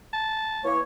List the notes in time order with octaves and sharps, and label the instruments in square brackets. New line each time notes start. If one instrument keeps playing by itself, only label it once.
[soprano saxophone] A5
[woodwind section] E3 A#3 C#5